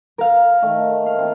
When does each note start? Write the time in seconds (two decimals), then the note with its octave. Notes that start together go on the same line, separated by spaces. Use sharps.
0.18 A#4 F5
0.62 D#3 A3
1.02 A#3 F5
1.19 C4 F4